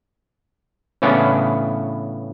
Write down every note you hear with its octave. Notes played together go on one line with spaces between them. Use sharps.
A2 C#3 E3 B3 C#4 D4